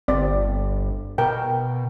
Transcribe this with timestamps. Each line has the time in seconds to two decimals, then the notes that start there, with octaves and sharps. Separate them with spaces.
0.08 G1 C4 D5
1.18 B2 A#4 G5